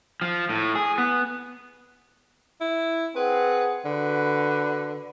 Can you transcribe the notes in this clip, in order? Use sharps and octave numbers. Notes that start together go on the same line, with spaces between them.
F3
A2
G#4
B3
E4
C4 G#4 B4 F#5
D3 F#4 B4